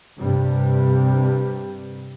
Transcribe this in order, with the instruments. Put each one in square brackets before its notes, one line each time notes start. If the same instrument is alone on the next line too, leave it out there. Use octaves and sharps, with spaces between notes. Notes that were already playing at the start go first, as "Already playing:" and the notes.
[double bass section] G2 C3 G3